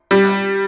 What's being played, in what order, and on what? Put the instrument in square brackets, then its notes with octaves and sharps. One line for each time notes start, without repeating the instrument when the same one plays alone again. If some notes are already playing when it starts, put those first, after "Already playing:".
[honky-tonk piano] G3